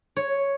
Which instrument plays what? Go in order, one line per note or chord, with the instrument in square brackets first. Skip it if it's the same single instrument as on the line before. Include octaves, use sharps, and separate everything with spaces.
[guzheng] C#5